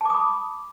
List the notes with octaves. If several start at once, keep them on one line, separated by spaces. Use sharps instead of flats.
A5 B5 D6 D#6